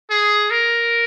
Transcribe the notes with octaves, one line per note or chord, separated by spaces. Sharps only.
G#4
A#4